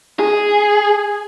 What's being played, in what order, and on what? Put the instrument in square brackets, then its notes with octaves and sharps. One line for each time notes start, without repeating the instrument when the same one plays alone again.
[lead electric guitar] G#4